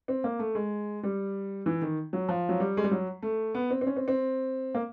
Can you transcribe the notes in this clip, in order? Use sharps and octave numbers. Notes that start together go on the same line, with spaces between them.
C4
A#3
A3
G#3
G3
E3
D#3
F#3
F3
F#3
G3
G#3
G3
F#3
A3
B3
C4
C4
C#4
C4
C4
A#3